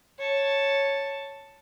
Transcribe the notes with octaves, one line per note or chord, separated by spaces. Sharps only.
C#5 A5